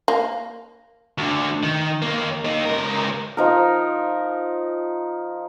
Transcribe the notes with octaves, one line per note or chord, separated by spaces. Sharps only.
A#3
D2 D3
D#3
D#2 A#3
A#3 D#4
C#2 A#4
F3 D#4 A#4